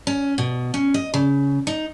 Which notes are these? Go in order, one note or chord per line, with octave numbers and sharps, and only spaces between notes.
C#4
B2
C#4
D#5
C#3
D#4